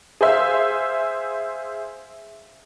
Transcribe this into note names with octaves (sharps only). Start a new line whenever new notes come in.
G#4 C5 E5 F5